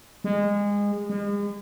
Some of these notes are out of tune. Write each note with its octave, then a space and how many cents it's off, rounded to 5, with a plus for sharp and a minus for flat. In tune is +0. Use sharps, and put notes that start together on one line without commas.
G#3 -25
G#3 -40